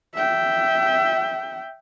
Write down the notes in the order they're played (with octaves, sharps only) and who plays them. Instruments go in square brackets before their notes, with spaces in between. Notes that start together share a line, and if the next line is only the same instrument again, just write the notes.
[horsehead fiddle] E5 G5